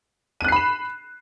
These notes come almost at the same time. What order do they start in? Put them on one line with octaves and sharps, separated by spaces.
D#7 F#6 C7 B5 E7